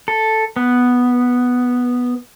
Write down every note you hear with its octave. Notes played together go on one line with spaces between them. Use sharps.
A4
B3